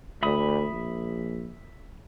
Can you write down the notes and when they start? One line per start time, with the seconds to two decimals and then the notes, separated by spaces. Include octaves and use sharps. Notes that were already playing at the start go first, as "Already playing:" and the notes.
0.23 D2 E5 B5 D#6
0.72 A#1